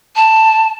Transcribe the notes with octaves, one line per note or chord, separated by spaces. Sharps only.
A5